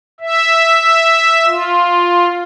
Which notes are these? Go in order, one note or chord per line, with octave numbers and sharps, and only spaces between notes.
E5
F4